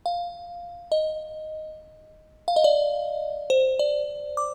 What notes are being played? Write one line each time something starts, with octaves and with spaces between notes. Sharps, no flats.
F5
D#5
F5
D#5
D5
C5
D5
D6